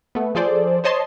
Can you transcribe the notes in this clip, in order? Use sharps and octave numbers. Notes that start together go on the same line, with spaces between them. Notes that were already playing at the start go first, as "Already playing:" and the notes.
A3 B3
F3 G#4 A4 C5 D5
C5 C#5 D#5 A5 C6